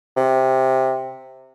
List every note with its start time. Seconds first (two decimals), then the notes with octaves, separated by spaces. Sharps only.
0.17 C3